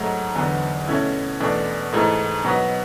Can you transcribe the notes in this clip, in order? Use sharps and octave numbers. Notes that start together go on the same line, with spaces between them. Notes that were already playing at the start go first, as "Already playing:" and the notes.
Already playing: G#2 F#3 A3
E2 D3 F#3 B3
B2 A3 C#4 E4
E2 B2 A3 D4
G#2 E3 A3
B2 F#3 B3